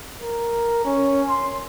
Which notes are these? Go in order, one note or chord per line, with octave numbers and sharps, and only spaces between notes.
A#4
C#4
C6